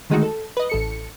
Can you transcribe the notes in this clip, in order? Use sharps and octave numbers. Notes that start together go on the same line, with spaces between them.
D3 D#3 G#3 A3 D#4 F#4
A4
B4 D#5
A1 A4 C#7